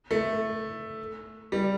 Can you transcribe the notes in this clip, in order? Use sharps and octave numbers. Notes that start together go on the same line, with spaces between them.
A3
G3